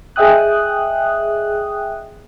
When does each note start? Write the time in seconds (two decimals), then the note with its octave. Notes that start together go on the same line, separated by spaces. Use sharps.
0.16 G#4 D#5 E5 G5 D#6 F#6